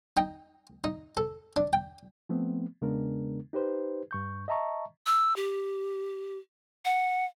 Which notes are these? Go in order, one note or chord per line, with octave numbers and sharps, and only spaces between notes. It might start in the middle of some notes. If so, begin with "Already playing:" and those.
D#4 G5
D#4
A4
D4
G5
F3 A3 B3 C4
E2 C#3 G#3 B3 D4 A#4
D#4 G4 B4 C5
G2 C#6 G6
D#5 E5 A5 A#5 C#6
E6
G4
F#5